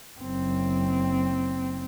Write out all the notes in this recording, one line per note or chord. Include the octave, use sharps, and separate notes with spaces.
F#1 C4